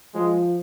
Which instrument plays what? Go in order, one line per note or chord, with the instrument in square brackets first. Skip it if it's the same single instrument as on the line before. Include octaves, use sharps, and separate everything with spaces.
[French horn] F3 [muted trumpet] G#3